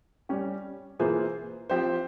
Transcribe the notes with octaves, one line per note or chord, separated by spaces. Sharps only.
G3 C#4 G4
E3 A#3 F4 G#4 C5
F3 C4 G4 C5